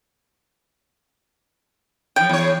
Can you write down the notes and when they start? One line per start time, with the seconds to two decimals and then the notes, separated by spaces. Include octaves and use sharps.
2.16 C#3 F3 G5
2.29 E2 C#5